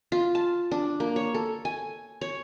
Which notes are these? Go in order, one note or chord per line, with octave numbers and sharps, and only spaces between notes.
F4
A5
D4
A#3
C#5
A4
G#5
C#5